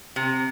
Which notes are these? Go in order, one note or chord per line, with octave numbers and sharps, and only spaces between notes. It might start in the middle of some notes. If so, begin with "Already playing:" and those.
C3